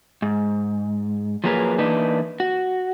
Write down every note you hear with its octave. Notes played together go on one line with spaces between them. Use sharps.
G#2
F3 F#3 A#3 G#4 A#4 B4
E3 A#3 D4 D#4 B4
F#4